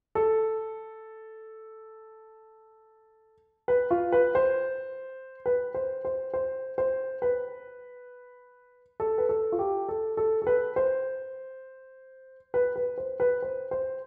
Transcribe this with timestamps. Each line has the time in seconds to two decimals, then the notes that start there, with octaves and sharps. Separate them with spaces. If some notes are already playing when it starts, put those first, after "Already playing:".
0.15 A4
3.68 B4
3.91 F4
4.12 B4
4.35 C5
5.46 B4
5.74 C5
6.05 C5
6.34 C5
6.78 C5
7.22 B4
9.00 A4
9.18 B4
9.29 A4
9.52 F4
9.59 G4
9.89 A4
10.17 A4
10.42 A4
10.47 B4
10.76 C5
12.54 B4
12.76 B4
12.98 C5
13.20 B4
13.42 C5
13.71 C5